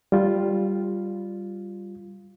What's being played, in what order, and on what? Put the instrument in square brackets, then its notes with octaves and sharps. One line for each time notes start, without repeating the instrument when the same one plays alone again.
[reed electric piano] G3 F4